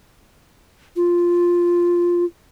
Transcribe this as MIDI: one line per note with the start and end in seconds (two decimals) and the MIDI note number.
0.96 2.25 65